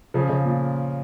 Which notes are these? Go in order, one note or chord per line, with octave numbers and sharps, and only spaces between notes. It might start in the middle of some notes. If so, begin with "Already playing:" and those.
C#3 F3
C#3
A#2